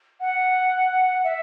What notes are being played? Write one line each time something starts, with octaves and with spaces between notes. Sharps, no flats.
F#5
E5